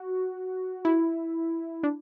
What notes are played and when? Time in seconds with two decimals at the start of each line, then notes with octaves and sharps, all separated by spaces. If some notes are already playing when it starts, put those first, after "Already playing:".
Already playing: F#4
0.85 E4
1.83 D4